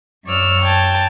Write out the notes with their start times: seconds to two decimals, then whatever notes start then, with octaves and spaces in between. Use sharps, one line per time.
0.25 F#2 C#5 D5 E6 F6
0.62 G5 A5 G#6